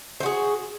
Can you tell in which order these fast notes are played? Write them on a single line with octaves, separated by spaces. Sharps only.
C5 F#4 G#4